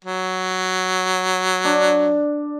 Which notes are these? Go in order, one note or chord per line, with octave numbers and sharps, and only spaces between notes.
F#3
D4